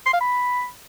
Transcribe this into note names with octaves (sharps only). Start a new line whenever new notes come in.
C6
F5
B5